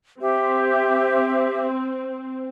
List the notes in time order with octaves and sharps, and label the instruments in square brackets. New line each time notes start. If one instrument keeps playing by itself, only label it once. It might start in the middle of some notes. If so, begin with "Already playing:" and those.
[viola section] C4 [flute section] G4 E5